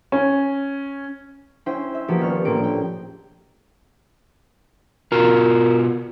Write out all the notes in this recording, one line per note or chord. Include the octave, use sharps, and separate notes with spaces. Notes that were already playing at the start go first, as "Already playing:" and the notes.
C#4
C#4 E4 C5 G5
E5
F3 A#3 B3 F#4 G4
D#1 C#6 F6
A#1 A2 A#3 C4 D7
G5
B2 F4 F#4 A#4